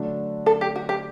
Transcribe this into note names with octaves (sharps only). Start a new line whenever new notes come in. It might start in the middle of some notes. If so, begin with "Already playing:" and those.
Already playing: D3 F#3 A3 D4
A4
G4
F#4
G4